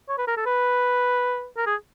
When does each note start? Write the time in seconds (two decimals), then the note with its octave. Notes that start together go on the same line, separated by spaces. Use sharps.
0.09 C#5
0.18 B4
0.27 A#4
0.37 A4
0.46 B4
1.57 A#4
1.66 G#4